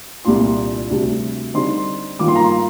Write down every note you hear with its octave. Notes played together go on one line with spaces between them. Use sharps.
C2 A#2 G3 D4 F4 C6
D2 C3 G3 D4
D3 G3 C4 D#4 C6
G2 D#3 A#3 F4 D6
C6
A#5
C6